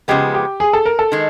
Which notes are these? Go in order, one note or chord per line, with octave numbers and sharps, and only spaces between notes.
C#3 F3 G#3 B3 G4
G4
G#4
A4
A#4
A4
D#3 G#3